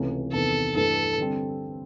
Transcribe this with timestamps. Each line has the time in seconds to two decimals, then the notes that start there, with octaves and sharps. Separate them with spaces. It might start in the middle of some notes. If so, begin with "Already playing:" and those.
Already playing: C#2 C3 E3 A3 C#4
0.33 E2 C3 D#3 A4
0.76 G2 E3 A3 A4
1.18 D3 G3 C4